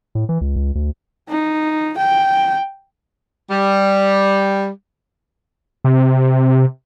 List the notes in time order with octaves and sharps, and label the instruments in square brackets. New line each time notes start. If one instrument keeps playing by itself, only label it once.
[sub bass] A2
E3
C#2
C#2
D2
[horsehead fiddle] D#4
G5
[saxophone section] G3
[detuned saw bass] C3